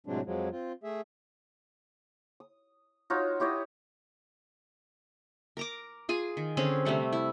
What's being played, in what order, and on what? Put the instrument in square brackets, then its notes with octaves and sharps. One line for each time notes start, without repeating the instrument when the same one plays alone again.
[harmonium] A2 C3 F#3 G#3 C4 D4
F2 F3 F#3 G#3
C4 F4
A3 G#4 E5
[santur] D#6
D#4 F4 F#4 C#5
E4 G4 C#5 D#5
[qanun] A#4 A#5 D6
F4 G#4 G#5
D#3
D3 C4 C#4 G#4
C3 G3 A3 F#5
E4